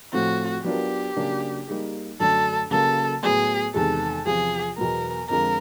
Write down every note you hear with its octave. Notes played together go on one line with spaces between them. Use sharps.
A2 F3 A3 C4 F#4
F#3 B3 D4 F4 G4 A#4
C#3 F#3 A#3 D4
G3 A#3 D#4 G#4
F#2 D3 F#3 A3 D4 A4
C#3 F#3 A#3 A4
A2 F#3 B3 G#4
E2 C3 D#3 G#3 A4
E2 C3 F3 G#4
E2 B2 F#3 B3 A#4
F2 D3 F3 G#3 A#4